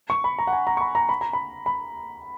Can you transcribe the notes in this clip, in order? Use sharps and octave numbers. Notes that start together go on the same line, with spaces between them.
C#6
B5
A#5
F#5
G#5
A#5
C#6
B5
A#5
B5
A#5
B5
B5